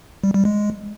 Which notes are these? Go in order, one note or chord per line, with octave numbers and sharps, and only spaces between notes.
G3
G3
G#3